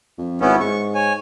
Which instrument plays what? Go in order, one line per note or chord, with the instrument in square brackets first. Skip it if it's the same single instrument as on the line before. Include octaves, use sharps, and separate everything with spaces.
[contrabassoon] F2
[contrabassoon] G#1 [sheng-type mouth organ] B3 C#4 E4
[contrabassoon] G#2 [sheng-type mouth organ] C#6
[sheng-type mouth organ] C#5 G#5